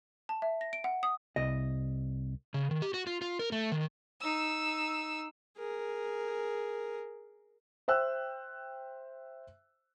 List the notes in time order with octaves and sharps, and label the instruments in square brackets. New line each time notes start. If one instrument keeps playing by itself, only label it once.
[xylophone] A5
E5
A#6
D7
F#5
D#6
[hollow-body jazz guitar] C2 D#5
[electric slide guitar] C#3
D#3
G4
F#4
F4
F4
A#4
A3
D#3
[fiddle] D#4 E6
[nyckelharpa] G#4 A#4
[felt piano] C5 E5 G5 E6 F#6